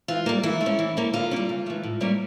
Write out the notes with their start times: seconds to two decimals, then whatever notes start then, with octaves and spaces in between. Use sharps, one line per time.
0.08 E3 F4
0.26 G3 A#3
0.43 E3 E4
0.61 A3
0.66 C#4
0.79 E3
0.97 A#3 C#4
1.13 D3 F4
1.31 G3 A#3 C#4
1.49 C#3
1.66 E3 A3
1.84 A2
2.01 G3 A#3 C#4